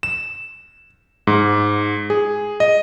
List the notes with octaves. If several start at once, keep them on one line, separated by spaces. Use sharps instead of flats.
E7
G#2
G#4
D#5